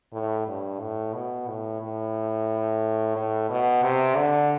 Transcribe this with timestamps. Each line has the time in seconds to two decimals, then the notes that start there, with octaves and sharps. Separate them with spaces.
0.13 A2
0.47 G2
0.80 A2
1.14 B2
1.48 A2
1.81 A2
3.16 A2
3.50 B2
3.83 C3
4.17 D3